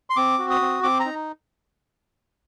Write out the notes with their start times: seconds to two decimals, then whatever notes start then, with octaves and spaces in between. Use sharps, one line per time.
0.10 C6
0.16 C4 D6
0.39 F#4
0.50 D#6
0.61 C4
0.83 C4 D6
1.00 A#5
1.05 D#4